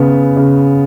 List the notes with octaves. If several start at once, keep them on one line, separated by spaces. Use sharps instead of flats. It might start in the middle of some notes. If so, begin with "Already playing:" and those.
Already playing: C#3 B3
C#3